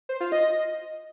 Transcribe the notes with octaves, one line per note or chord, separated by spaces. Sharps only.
C5
F4
D#5